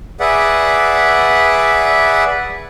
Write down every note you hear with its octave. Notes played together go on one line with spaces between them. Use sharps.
G#4 B4 D5 E5 F#5